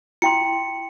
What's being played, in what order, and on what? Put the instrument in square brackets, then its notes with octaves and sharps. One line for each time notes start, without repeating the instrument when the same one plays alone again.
[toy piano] E4 G5 C6 [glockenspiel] C#7